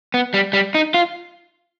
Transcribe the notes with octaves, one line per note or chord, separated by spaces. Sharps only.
B3
G3
G3
D#4
F4